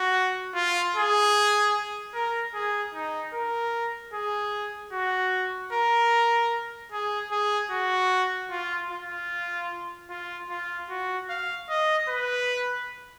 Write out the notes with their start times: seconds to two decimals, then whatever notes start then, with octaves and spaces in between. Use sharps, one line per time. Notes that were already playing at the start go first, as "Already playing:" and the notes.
Already playing: F#4
0.55 F4
0.96 G#4
2.15 A#4
2.54 G#4
2.94 D#4
3.34 A#4
4.14 G#4
4.93 F#4
5.73 A#4
6.92 G#4
7.32 G#4
7.71 F#4
8.51 F4
8.90 F4
10.10 F4
10.50 F4
10.90 F#4
11.30 F5
11.69 D#5
12.09 B4